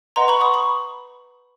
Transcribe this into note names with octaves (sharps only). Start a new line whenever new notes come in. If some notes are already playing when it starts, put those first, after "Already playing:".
B4 D#5 F#5 A#5 C6
B5 C#6
C#6 D#6
B5 C#6